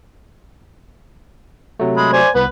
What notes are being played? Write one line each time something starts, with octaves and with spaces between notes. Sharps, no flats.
C3 F#3 A3
G#3 B5
C5 D5 G#5
C2 B3 B4